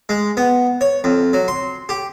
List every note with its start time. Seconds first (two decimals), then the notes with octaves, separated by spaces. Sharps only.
0.09 G#3
0.37 B3
0.81 C#5
1.04 F2
1.33 F#3
1.48 C6
1.89 G4